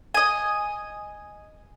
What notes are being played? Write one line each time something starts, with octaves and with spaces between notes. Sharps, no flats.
D#5 G#5